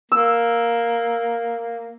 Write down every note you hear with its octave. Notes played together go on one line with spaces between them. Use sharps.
A#3 E6